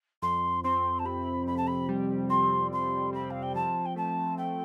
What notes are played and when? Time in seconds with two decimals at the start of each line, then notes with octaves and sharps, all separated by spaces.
0.22 F2 C6
0.64 C4 C6
0.99 A5
1.05 C3 B5
1.47 F2 B5
1.57 A5
1.67 B5
1.89 G3
2.29 C4 C6
2.71 F2 C6
3.13 C4 B5
3.30 F5
3.42 G5
3.55 F3 A5
3.85 G5
3.96 A3 A5
4.37 A3 G5